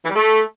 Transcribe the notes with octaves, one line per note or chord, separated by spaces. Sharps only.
E3
G3
A3